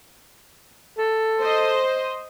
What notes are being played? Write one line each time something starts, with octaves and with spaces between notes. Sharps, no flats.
A4
C5 D#5